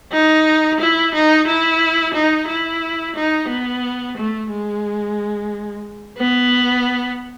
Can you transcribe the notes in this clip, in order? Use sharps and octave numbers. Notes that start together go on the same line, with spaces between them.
D#4
E4
D#4
E4
D#4
E4
D#4
B3
A3
G#3
B3